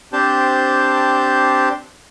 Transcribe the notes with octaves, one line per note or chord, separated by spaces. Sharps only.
C4 D4 G4 C5 A5 G6